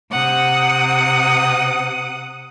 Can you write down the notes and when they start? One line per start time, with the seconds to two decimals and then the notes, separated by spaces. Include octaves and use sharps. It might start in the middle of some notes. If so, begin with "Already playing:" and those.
0.11 C3 F#5 D#6